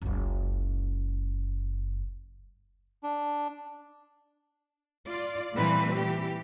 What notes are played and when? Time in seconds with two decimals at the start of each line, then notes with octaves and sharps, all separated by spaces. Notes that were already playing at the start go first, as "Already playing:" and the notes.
0.02 F#1 C#2
3.04 D4
5.06 F4 D5
5.54 A#2 E3 G3 A3 C4 B4
5.97 E3 G4